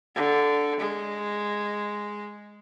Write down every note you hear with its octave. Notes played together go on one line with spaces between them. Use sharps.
D3
G#3